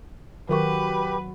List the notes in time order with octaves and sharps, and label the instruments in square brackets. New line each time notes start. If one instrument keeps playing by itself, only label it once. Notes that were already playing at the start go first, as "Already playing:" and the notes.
[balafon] D#3 A#4 C#6 [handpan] F#3 F#4 [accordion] G4 [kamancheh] B4